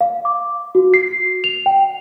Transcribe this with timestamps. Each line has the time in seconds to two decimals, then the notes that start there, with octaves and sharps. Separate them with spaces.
0.01 F5
0.25 D6
0.75 F#4
0.94 C7
1.44 F7
1.66 G5